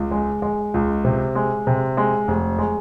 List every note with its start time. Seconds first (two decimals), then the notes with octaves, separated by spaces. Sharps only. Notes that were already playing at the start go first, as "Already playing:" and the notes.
Already playing: C#2
0.11 G#3
0.42 G#3
0.74 C#2
1.05 C3
1.35 G#3
1.67 C3
1.97 G#3
2.28 F1
2.59 G#3